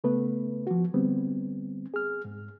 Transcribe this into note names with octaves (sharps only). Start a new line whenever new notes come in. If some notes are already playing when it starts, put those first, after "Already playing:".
C#3 A3 B3 B4
F3 F#4
D3 G3 B3 C4
G#4 F6
G#2